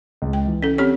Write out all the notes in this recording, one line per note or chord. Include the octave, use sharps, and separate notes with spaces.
C#2
G5
E3
C#4 A4
C4 G4 C#5